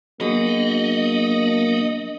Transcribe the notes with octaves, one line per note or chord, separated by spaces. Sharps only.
F#3 A#3 B3 D4 F#4 G#4 D#5